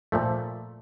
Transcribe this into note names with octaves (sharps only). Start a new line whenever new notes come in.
A#2 F3 A3